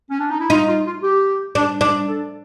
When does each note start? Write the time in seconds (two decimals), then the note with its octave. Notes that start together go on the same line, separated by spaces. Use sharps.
0.10 C#4
0.19 D4
0.30 D#4
0.40 E4
0.50 D#4 F4
0.68 F4
0.85 F4
1.03 G4
1.55 D4
1.81 D4
2.08 A4